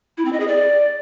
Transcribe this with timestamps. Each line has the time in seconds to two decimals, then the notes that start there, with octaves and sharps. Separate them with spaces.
0.17 E4
0.25 C4
0.33 D#5
0.40 G#4
0.48 D5